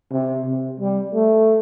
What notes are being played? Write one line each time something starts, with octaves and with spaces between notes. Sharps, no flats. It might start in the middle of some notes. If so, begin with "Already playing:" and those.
C3
C3
G3
A3